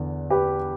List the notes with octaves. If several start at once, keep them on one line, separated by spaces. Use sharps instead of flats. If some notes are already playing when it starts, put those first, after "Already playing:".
Already playing: E2 D3
G4 B4